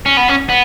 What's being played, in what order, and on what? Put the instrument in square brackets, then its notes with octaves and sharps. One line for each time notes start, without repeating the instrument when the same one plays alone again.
[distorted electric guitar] C#4
B3
C#4
B3